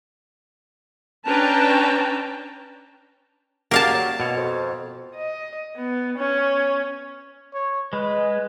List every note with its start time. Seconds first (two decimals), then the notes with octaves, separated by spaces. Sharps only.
1.27 C#4 D4 B4 G5 A5 A#5
3.71 A#3 F#4 G4 A#4 D5 F5 A5
3.93 F#3
4.20 B2 F#4 C#5
4.37 F2
5.16 D#5
5.77 B3
6.18 C#4
7.54 C#5
7.93 G#3 B4